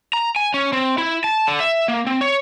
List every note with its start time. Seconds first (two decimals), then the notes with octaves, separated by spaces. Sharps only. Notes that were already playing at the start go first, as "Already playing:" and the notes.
0.13 A#5
0.36 G#5
0.54 C#4
0.73 C4
0.98 E4
1.24 A5
1.47 D3
1.60 E5
1.88 A#3
2.07 C4
2.21 C#5